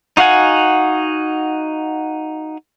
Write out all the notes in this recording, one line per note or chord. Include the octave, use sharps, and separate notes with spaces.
D#4 F#4 F5 F#5 G#5